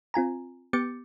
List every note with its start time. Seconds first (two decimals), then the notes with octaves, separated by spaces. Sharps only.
0.14 C4 F4 G#5 A#5
0.73 B3 G4 D6 G6 A6 C#7